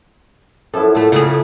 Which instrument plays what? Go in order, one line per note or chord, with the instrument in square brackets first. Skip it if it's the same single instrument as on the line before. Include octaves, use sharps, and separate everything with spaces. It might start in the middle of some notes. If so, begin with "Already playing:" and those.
[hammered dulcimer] F#2 F3 E4 [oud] A4
[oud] A2 A3 [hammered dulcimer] A4
[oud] C#3 A3 G#4